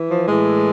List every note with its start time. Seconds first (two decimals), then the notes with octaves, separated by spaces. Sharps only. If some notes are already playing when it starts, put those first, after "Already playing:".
Already playing: E3
0.11 F3
0.28 A2 E3 G#3